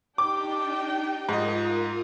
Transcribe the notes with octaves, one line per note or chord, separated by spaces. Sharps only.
D4 D#4 G4 G5 D6
G#2 F4 A#4 D#5 D#6